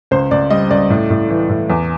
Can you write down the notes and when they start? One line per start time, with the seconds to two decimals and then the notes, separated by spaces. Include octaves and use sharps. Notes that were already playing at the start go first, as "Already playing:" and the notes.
0.11 C#2 C5
0.31 C#2 D5
0.50 G3 D#5
0.70 C#2 D5
0.90 A2
1.10 A2
1.30 E3
1.49 A2
1.70 E2